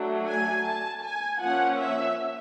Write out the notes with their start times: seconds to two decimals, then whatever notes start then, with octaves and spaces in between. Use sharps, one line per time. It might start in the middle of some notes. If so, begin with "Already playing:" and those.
Already playing: F#3 A3 D4
0.28 G#5
0.66 A5
1.03 G#5
1.41 F3 A#3 C#4 F#5
1.79 E5